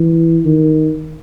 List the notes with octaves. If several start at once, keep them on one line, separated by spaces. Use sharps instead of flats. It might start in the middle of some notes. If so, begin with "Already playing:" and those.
Already playing: E3
D#3